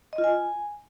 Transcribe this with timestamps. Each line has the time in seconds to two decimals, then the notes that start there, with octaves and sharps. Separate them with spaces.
0.13 D#5
0.18 F4
0.24 G#5